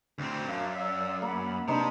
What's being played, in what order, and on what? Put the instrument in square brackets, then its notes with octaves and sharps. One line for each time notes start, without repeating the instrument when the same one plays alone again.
[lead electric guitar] D2 C4
[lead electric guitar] F#2 [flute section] D4 F5
[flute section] D5 F5 E6
[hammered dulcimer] A#3 [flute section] F#5 B5
[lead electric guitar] C3 [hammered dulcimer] D4 D#4 B4